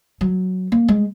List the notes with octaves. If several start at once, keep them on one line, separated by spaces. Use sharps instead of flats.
F#3
A#3
G#3